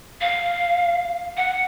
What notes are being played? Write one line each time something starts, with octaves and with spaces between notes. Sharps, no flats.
F5
F#5